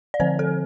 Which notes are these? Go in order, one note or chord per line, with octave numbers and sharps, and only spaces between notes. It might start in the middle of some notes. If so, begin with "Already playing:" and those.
D5
D3 F3 C4 C5
A4